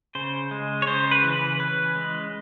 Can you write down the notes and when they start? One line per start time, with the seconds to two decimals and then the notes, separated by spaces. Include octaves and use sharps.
0.15 C#3 C5
0.51 G#3
0.82 C#5
0.87 C#3 C5
1.11 B4
1.23 E3
1.36 B4
1.59 C#4 B4
1.95 G#3